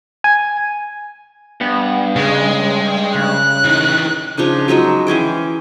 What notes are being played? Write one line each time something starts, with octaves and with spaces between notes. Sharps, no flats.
G#5
G2 B3
C#3 G#3
C#3 F#6
D#3 E3
C#3 F3 D4 D#4
F3 F#3 G#3 D#4
E3 C#4 G#4 G5